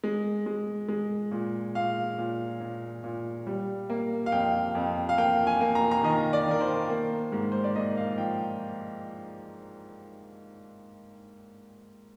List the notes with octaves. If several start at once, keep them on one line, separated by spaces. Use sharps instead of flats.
G#3
G#3
G#3
A#2
A#2 F5
A#2
A#2
A#2
G3
A#3
F5
F2 G5
F2
F5
A#3 G5
G#5
A#3
A#5
A#5
D#3 D#5
D5
D#3 A#4
C5
A#3
G#2
C5
D5
A#3 D#5
F5
F3 G5